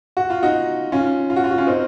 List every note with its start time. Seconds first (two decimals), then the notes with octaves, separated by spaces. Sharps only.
0.17 F#4
0.30 F4
0.43 D#4 F#4
0.92 C#4 F4
1.30 F4
1.36 F#4
1.44 F4
1.51 F#4
1.58 C#4 F4
1.67 C4 D#4